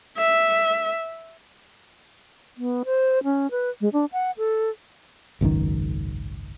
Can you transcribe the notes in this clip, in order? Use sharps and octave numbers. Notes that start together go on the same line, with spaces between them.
E5
B3
C5
C#4
B4
G#3
D4
F#5
A4
G#1 C#2 F#2 D#3